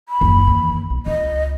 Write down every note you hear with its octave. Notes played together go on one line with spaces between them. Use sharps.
B5
F#1 D#2
D#2 E3
B1
C#2 D#5